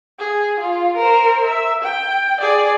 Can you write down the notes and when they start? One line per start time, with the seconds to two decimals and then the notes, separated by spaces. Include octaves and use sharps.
0.19 G#4
0.60 F4
0.97 A#4 C5
1.44 E5
1.83 G5
2.41 G#4 D5